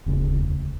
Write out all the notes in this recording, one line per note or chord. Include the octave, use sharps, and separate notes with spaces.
E1 D2 C#3